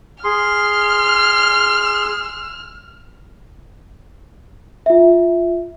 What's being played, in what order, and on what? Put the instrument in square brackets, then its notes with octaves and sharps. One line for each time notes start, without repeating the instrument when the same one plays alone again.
[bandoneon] G#4 C6 [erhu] F6
[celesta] F4 E5